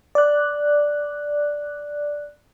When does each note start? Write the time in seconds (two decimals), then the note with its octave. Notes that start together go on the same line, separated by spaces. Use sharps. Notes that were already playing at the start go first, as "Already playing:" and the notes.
0.15 D5 F#6